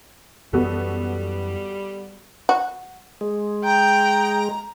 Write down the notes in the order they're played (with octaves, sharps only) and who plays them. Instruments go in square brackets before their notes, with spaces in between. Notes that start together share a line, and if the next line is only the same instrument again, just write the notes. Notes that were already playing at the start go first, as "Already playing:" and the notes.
[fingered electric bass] F#2 E3 [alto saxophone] G3 [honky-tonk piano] B3 F#4 A4
[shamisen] F#4
[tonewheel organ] G#3
[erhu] G5 [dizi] A#5